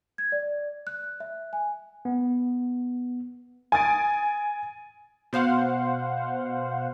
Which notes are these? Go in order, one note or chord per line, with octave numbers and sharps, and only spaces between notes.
G#6
D5
F#6
E5
G#5
B3
G#5 D#6 A6 D7
B2 C5 F5 F#5